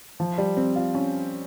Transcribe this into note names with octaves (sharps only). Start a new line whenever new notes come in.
F3
G3
C4
F4
C#4